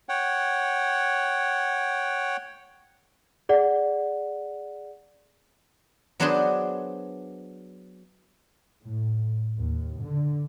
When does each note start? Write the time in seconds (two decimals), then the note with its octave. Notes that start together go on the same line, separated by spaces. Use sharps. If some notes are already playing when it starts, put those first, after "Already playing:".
0.09 C#5 F#5 G5
3.49 G#4 D5 F#5
6.20 F#3 B3 D4 G#4 C5 C6
8.83 A2
9.58 D#2
10.04 D3